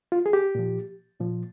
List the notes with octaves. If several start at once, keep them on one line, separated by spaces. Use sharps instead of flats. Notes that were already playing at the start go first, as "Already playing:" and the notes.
F4
G#4
G4
A#2 F3
A#2 F3